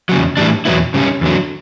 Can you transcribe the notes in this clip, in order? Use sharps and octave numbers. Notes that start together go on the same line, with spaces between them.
E2 C#3 F#3
A2 E3 G3 D4
E2 B2 F#3 B3 E4
C#3 G3 C#4
E2 D3 F#3